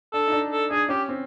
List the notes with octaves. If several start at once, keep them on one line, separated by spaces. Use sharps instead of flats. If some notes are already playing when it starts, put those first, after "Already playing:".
D4 A4
D#4
D4
A4
D4 G#4
C#4 G4
C4